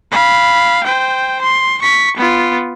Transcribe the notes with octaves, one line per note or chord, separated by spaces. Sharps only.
F5 B5
C5 G5
C6
C#6 B6
B3 F4